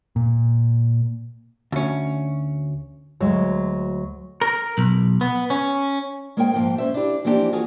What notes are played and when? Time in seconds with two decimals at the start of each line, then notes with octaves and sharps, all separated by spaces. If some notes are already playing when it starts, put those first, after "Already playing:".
0.16 A#2
1.72 D2 C#4
3.20 D2 F#3 G#3
4.42 A#4
4.78 B1
5.21 B3
5.50 C#4
6.37 G#3 A#3 C4 A#4 C#5 G5
6.54 G#2 F3 A#3 G5
6.78 C#4 C5 E5
6.94 D4 E4 G4
7.25 E3 F3 A#3 C4 D4 G4
7.53 F4 F#4 G#4 C#5